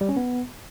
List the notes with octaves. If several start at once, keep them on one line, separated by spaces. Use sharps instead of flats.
G3
C#4
B3